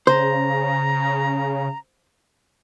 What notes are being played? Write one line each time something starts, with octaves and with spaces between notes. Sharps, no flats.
C#3 C5 A#5